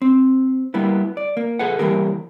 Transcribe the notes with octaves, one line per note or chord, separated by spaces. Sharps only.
C4
G3 A#3 B3 E4
D5
A#3
G#4 A4 B4 F#5
E3 F3 G3 A#3 G4 A#4